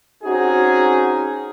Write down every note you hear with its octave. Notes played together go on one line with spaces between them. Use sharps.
C4 C#4 D#4 F#4 G#4